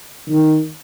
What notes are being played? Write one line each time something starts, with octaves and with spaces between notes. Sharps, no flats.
D#3